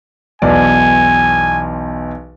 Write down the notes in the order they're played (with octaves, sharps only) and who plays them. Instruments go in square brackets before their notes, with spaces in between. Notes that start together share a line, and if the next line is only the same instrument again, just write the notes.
[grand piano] B1 E2 D5 [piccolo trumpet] G#5